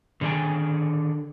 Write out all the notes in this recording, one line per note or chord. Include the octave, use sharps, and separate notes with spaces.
D3 D#3 G#4 D#5 G5 G#5